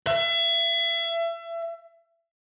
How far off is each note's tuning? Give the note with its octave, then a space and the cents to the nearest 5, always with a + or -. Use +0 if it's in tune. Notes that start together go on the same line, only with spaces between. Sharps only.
E5 +30